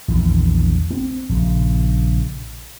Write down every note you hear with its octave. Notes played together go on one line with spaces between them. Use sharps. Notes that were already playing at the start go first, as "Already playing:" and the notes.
A#1 E2 D#3
B3 C4
A#1 C#3